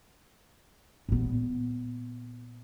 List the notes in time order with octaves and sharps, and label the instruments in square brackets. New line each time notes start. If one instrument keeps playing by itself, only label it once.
[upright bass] A#2 B3